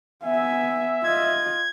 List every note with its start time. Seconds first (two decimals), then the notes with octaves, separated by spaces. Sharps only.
0.24 B3 E5 G#5
1.04 F4 D#5 G#6